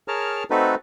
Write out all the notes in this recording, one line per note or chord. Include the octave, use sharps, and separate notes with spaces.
G#4 A#4 C#5 A5 A#5 F6
A3 C4 D#4 F#4 A4 B4